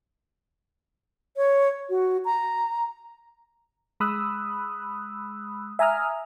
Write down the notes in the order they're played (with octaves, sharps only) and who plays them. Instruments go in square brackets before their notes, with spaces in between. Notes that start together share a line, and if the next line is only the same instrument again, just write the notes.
[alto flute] C#5
F#4
A#5
[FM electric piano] G#3 B5 D#6 E6 F#6
E5 G#5 A#5 D#6 F6